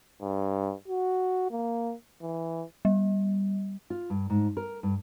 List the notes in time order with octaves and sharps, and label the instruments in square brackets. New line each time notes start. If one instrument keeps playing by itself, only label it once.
[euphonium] G2
F#4
A#3
E3
[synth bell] G3
[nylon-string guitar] F4
G2
G#2
A#4
G2